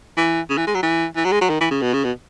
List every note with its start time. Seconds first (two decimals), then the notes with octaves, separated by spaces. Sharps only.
0.17 E3
0.50 C#3
0.57 E3
0.67 G#3
0.75 F#3
0.82 E3
1.16 E3
1.25 F#3
1.32 G#3
1.41 F#3
1.49 D#3
1.61 E3
1.71 C#3
1.81 B2
1.93 C#3
2.04 B2